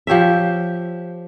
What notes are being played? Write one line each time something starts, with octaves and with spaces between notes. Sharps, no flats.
F3 G4 C#5 E5